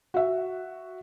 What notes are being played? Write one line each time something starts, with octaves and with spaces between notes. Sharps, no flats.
F#4 E5